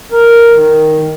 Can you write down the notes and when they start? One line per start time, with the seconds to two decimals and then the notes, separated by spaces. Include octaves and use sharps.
0.12 A#4
0.52 D#3